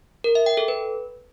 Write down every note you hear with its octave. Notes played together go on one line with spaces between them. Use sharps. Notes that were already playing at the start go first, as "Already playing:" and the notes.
A#4
E5
G5
A4
B4